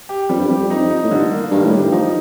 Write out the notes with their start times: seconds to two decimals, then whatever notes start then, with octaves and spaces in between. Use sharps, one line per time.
0.09 G4
0.29 F2 G3
0.38 G2
0.49 F2 G4
0.70 F2 D#4
0.90 D#4
1.04 A2
1.10 G2 D3
1.31 A#3
1.51 G2 D#3
1.64 A2
1.72 G4
1.77 G2
1.92 F3 D#4